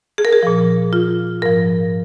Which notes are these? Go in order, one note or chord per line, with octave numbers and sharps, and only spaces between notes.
G#4
A#4
G#4
A#2 F3
F4
G#2 F3 A#4